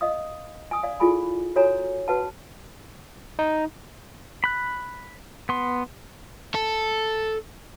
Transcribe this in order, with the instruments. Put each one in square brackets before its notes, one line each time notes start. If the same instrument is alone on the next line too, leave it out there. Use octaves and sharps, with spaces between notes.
[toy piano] D#5 F5 D#6
G#5 D#6
D5 F5
E4 F4 G#4 A4 G#5 B5
F#4 A4 C#5 G#5 A#5
F#4 B4 F#5 A5
[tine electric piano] D#4
[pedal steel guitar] B5 F#6
B3 C6
[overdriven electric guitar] A4